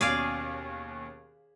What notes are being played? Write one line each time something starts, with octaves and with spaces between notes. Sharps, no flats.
D#2 B2 C#4 G#4 D5 F5